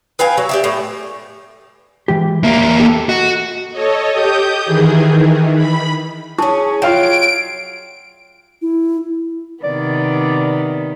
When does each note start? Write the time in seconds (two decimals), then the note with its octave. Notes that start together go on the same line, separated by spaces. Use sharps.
0.19 B4 F5 G5 G#5
0.37 F#3
0.49 G4 D5 E5
0.64 A2
2.08 E3 G#3 G4
2.43 E2 A#3 E5
2.80 G4 A4
3.09 F#4 D#5
3.71 A4 C#5 D#5
4.12 G4 D#6 G6
4.65 D#3 E3 G#4
5.08 D#3 E3
5.55 B5
6.39 C#4 E4 G#4 A5 C#6
6.82 F#3 F4 F5 G5 D7
8.62 E4
9.64 C3 D#3 B3 D5